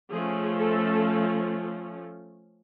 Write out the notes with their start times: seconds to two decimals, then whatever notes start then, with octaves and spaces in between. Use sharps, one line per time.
0.11 F3 A3 C#4 G#4
0.58 A4